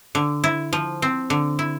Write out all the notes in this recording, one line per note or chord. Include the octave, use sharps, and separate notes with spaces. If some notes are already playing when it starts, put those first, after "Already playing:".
D3
E4
F3
C4
D3
E4